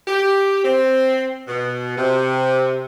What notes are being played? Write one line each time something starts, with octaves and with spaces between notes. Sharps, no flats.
G4
C4
B2
C3